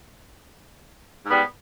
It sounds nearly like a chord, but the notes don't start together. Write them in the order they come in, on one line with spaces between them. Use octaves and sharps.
G#2 B3 G3